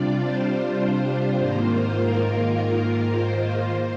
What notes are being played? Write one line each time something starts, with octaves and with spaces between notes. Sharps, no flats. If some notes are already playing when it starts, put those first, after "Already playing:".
Already playing: C3 G3 D4 F4 D5
C5
G#2 D#3 A#3 F4
A#4
C5